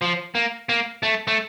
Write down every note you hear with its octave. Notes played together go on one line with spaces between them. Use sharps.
F3
A#3
A#3
A3
A3